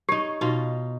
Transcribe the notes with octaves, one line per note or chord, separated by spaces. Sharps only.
D#4 G4 C#5
B2 D#4 F4